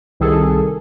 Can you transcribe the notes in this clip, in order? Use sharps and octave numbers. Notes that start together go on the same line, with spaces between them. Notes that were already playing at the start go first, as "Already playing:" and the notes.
C2 D#3 G#4 A4